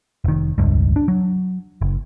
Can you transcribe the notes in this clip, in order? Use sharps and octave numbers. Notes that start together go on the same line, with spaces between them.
F1 D#3
E1 C#2 G2
D4
F#3
F#1